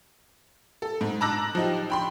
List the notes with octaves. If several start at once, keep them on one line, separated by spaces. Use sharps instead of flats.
A4
G#2
A5 A#5 D6 E6 F#6 A#6
F3 D#4 G4
G5 B5 C6